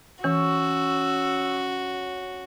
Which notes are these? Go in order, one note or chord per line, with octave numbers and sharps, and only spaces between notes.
E3 C#4 F#4 E6